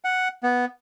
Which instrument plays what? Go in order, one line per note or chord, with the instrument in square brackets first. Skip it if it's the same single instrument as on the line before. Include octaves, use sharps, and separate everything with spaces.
[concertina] F#5
B3